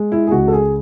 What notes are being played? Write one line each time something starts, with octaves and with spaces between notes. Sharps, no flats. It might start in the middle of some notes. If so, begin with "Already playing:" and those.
Already playing: G#3
E4
G#4
C#2 F#4
A4
G#4